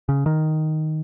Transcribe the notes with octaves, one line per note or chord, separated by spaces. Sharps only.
C#3
D#3